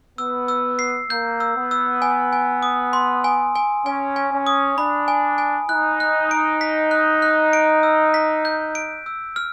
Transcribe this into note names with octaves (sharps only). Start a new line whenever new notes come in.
B3 E6
E6
C7
A#3 G6
E6
B3
E6
G#5
G#5
D#6
C6
G#5
G#5
C#4 G#5
G#5
C#4
D#6
D4 B5
G#5
G#5
D#4 F#6
F#6
D7
B6
F#6
F#6
D7
E6
B6
G6
D7
E6
F6